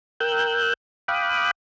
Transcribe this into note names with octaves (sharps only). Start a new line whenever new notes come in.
A#4 G5 E6 F#6 G6
F5 G5 B5 D6 D#6 F#6